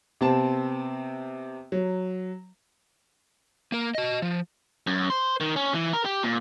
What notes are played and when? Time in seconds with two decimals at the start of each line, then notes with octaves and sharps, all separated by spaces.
0.21 C3 B3 C4 A5
1.72 F#3
3.72 A#3 A#4
3.95 F#4 D#5
4.22 F3
4.87 F#2
5.10 C5
5.40 D#3
5.56 C#4
5.74 E3
5.93 A#4
6.05 G4
6.23 A#2